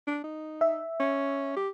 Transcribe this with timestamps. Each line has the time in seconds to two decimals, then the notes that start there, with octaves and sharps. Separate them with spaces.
0.07 D4
0.24 D#4
0.61 E5
1.00 C#4
1.56 G4